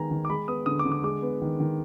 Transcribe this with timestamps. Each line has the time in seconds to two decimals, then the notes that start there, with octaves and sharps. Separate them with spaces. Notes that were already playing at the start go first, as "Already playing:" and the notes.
Already playing: D#3 G#3 B3 G#5 A#5
0.11 D#3
0.25 D6
0.30 G#3 B5
0.48 B3 D#6
0.66 D3 D#6
0.79 D6
0.85 D3
0.92 D6
1.03 G#3 D6
1.22 B3
1.42 D#3
1.60 D#3